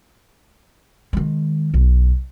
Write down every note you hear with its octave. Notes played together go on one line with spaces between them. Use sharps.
D#3 G#3
B1